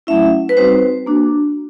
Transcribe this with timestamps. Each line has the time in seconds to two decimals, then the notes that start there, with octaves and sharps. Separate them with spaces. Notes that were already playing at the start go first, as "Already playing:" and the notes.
0.07 F#3 A3 C#4 E4 E5
0.49 B4
0.57 G3 C4 D#4 F#4 C5
1.06 A#3 D4 F#4